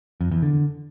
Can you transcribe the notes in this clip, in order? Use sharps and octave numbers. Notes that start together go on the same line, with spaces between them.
F2
E2
D3